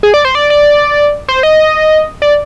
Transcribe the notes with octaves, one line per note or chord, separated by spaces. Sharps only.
G#4
D5
C5
D5
D5
C5
D#5
D5